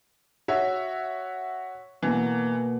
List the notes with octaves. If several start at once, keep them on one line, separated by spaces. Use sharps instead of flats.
F#4 C#5 E5
B2 E3 A#3